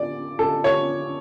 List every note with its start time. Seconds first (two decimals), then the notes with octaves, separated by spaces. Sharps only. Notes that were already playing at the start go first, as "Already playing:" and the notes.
Already playing: D5
0.39 A4
0.64 C#5